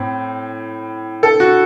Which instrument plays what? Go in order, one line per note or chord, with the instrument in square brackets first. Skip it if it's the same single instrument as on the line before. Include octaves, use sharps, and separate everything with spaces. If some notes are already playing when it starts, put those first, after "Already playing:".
Already playing: [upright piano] A2 C4
A4
F#4